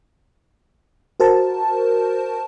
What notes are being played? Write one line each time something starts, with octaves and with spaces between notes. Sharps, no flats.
F#4 A#4 C5 A5